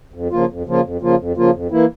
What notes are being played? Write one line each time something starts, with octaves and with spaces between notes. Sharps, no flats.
F2
C#3 F3 A#3 F4
F2
C#3 F3 A#3 F4
F2
C#3 F3 A#3 F4
F2
C#3 F3 A#3 F4
F2
E3 A#3 E4